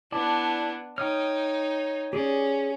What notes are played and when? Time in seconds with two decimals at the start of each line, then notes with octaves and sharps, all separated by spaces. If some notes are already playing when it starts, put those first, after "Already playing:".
0.12 B3 D4 E4 D5 A5
0.98 D#4 C#5 G5 D#6 F6
2.13 C#4 G4 G#4 D5